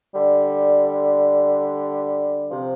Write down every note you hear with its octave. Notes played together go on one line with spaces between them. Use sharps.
D3 G3
C3 F3